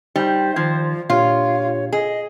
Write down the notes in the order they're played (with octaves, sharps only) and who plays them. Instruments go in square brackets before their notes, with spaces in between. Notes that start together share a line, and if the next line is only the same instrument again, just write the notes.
[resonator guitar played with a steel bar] G3 [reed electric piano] D#4 G5 [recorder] C5
[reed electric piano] D#3 G#6 [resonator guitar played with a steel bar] F3
[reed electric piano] A#2 D4 G4 [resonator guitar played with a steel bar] F4 [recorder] C#5
[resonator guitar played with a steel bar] G#4 [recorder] D#5